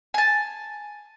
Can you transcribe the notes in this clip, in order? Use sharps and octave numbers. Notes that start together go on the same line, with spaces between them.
G#5 A5